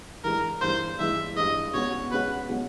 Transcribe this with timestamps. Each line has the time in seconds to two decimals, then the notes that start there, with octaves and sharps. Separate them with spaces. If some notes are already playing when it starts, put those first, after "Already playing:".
0.24 G2 E3 G#3 A#4
0.61 G2 E3 G#3 C5
0.99 G2 E3 G#3 E5
1.36 G2 E3 G#3 D#5
1.74 B2 G#3 C#4 F#4 C#5
2.11 B2 G#3 C#4 F#4 B4
2.50 B2 G#3 C#4 F#4